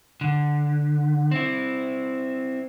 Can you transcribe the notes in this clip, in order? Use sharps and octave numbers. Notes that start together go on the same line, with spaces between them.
D3
C4 E4